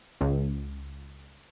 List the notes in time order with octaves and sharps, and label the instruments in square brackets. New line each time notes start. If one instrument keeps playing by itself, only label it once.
[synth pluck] C#2